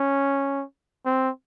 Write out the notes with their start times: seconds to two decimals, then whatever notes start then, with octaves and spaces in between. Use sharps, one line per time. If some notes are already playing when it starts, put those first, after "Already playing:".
Already playing: C#4
1.06 C4